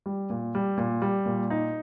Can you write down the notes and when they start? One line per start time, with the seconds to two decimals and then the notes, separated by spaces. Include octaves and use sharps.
0.06 G3
0.30 A#2
0.55 G3
0.77 A#2
1.02 G3
1.26 A#2
1.50 D#4